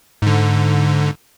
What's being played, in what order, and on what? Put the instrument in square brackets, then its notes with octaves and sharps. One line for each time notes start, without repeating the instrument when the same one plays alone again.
[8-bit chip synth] G#2 D3